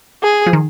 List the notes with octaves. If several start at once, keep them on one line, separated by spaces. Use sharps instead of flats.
G#4
F3
D#3